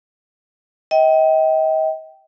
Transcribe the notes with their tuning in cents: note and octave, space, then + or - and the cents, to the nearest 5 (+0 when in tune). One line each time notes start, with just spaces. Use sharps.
D#5 +35 G5 -15